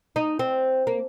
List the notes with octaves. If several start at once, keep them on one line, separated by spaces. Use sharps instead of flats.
D#4
C4
A#3